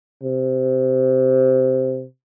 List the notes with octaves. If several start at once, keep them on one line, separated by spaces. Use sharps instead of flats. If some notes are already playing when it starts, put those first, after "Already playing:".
C3